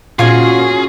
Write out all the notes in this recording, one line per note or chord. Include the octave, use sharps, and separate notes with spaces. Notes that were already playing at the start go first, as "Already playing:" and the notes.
A#2 C#4 F4 F#4 G#4 C#5